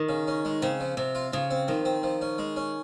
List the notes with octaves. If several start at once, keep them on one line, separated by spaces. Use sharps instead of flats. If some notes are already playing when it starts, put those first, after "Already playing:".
Already playing: D#3
C#3
C#4
G#3
C#3 C4
F3
C3 F3
F4
C#3 F3
C4
D#3 F3
C4
F3
C#4
G#3
C#4